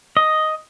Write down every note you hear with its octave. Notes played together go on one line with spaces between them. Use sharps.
D#5